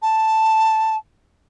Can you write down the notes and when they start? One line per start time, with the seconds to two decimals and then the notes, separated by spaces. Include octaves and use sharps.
0.02 A5